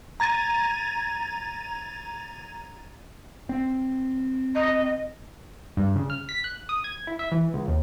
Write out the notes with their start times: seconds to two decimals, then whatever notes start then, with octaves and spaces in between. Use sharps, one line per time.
0.20 A#5 G#6 A6 D#7
3.49 C4
4.55 D#5
5.77 G2
5.96 C#3
6.10 F6
6.29 B6
6.44 F#6
6.69 D#6
6.84 G#6
7.07 E4
7.19 E5
7.32 E3
7.54 C#2
7.68 D#2